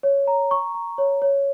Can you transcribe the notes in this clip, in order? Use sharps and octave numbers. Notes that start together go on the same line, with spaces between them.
C#5
A#5
C#6
A#5
C#5
C#5